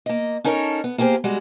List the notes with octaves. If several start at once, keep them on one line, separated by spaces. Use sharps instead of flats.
A#3 D#5
C#4 D#4 A4 A#4 C#5
B3
A#3 F4 G4 G#4 C5
G3 G#3 F#4